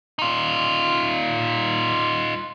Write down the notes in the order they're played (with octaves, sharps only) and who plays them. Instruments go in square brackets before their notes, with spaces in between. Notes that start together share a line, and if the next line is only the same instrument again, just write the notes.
[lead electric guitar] D#4 F4